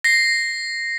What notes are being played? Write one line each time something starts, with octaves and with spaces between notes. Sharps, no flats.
A#6 C7